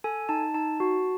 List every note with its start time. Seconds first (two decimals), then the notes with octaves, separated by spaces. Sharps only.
0.04 A4 G#5
0.29 D#4 A5
0.54 D#4 A5
0.80 F#4